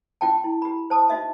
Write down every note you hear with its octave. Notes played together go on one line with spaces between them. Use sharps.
C#4 F4 G5 A5
E4
G4 B5
C5 A5 D#6
D#4 F#4 D#5 E5